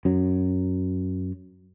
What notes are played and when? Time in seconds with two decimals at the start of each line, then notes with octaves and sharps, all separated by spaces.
0.05 F#2 F#3